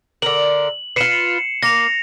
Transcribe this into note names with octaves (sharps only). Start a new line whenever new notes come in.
D3 A#4 F#7
F4 B4 C7 C#7 E7
A#3 A#6 F7